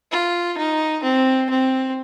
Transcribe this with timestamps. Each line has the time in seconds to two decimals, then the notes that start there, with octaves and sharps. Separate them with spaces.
0.12 F4
0.58 D#4
1.04 C4
1.50 C4